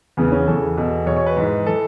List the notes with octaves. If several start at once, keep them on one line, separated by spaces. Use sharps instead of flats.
E2 C#3 E3 B3
C#4
E2 C#3 E3 A4
E2 B2
E2 B2 C#5
C#5
B4
G#2 E3
E3 A4